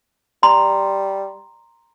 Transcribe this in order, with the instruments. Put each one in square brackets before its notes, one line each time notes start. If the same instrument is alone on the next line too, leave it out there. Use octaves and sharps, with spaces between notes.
[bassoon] G3 [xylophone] A#5 [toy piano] C6